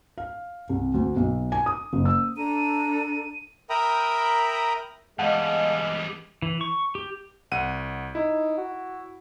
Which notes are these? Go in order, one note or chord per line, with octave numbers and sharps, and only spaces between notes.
F5
C2
D2
B1
G#5
D#6
F#1
E6
D4 A4 A#5 D#7
A#4 E5 G5 A#5 B5 D#6
E2 G3 G#3 D#5 F5 F#5 A5
E3
C#6
G4
C2 F#5 D#7
D#4 E4
F#4